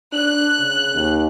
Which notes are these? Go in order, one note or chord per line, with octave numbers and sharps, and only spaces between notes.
D4 F#6
C#3
D#2